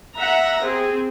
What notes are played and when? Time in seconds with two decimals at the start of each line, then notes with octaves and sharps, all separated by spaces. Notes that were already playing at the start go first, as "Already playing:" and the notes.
0.17 E5 F#5 A#5
0.62 C4 G#4